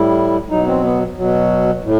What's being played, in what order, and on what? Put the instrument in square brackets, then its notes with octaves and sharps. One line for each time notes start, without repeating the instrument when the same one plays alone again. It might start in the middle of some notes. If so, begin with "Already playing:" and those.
Already playing: [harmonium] A2 G3 E4
B2 F#3 D#4
C4
B3
B2 F#3
A2